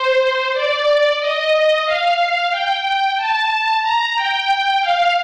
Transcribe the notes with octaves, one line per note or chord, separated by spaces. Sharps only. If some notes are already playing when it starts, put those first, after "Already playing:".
Already playing: C5
D5
D#5
F5
G5
A5
A#5
G5
F5